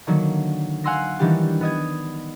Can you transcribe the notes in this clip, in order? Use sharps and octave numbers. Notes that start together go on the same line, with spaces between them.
D3 D#3 F#3 A#3
F5 F#5 G#5 C6 E6 A#6
D#3 E3 G3 D4 G4
B3 D#5 G#6